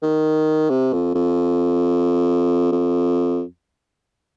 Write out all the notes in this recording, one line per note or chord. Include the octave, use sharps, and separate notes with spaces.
D#3
C3
F2
F2
F2